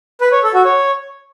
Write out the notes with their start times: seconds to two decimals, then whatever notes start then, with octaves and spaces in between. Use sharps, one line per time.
0.21 B4
0.32 C#5
0.43 A4
0.54 F#4
0.65 C#5